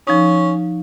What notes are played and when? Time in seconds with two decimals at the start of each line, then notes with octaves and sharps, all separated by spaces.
0.07 F3 C#4 D#4